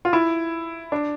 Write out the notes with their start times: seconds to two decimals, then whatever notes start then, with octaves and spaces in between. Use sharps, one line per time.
0.05 F4
0.13 E4
0.92 D4